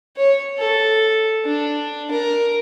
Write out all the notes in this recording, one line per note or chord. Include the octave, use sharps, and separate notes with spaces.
C#5
A4
D4
A#4